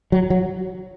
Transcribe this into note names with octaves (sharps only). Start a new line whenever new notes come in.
F#3
F#3